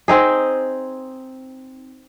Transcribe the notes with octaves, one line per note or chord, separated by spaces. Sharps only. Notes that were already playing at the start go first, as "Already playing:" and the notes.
C4 D#4 G#4